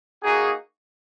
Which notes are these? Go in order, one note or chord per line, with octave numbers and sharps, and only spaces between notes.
A#3 D#4 F#4 G#4